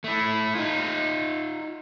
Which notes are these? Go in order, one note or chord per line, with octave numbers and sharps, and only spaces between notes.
A3 E4
D#4 F4